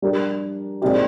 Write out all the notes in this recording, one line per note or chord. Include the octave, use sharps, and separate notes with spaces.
G3 D4 G4 A#4
A#2 G#3 C4 D#4 G4